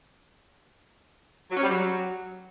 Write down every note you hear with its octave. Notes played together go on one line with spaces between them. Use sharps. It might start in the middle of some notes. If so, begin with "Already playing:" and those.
F#3
C#4
G3
F#3